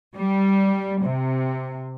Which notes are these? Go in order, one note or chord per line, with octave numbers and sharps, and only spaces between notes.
G3
C3